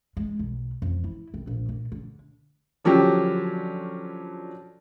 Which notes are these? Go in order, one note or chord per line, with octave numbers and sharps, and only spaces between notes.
G#3
B1
F2
E4
C2
A#1
A#2
D3
D3 F3 F#3 C#4 G4